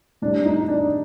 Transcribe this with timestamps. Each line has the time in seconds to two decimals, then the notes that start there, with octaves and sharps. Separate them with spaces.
0.22 A2 G3 D4
0.45 D#4
0.68 D4